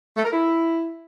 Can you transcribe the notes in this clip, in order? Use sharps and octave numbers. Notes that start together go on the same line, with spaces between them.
A3
A#4
E4